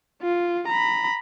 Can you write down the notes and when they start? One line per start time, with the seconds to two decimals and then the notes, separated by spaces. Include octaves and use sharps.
0.22 F4
0.68 A#5 B5